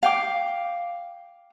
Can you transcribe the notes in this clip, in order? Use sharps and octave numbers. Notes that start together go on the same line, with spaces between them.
F5 G5 D6